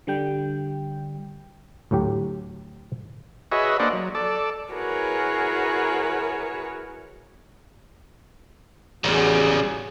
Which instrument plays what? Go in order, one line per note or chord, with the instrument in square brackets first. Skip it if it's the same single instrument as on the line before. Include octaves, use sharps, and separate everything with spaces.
[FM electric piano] D3 G3 G5
[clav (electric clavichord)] D2 A2 F#3 G4
[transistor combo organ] F#4 G#4 B4 C#5 D#5 E5
A#3 D4 C5 D5 D#5 F#5
F#3
A4 D5
[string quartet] E4 F#4 G#4 A#4 B4 C#5
[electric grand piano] A1 E2 [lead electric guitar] C#3 G3 [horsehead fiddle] F#4 G#4